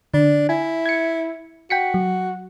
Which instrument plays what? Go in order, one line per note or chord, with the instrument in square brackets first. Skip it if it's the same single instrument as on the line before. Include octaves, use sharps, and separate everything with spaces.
[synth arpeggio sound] D3 [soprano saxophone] D4
[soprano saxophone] E4 [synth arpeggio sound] G#5
[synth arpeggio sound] G#6 C#7
[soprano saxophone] F#4 [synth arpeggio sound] G5 B6 C#7
[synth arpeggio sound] F#3